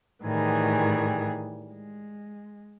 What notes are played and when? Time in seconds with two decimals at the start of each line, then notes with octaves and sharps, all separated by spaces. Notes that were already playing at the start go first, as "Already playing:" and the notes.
0.23 A2 D#3 E3 G3 G#4
1.72 G#3